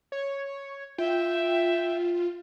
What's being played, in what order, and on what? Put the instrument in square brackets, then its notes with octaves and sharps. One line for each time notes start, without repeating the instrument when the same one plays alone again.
[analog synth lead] C#5
[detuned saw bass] F4 [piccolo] E5 [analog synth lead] G5